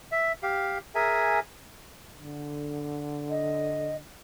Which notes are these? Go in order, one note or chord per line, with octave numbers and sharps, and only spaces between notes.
E5
G4 F5
G#4 A#4 E5 G#5
D3
D#5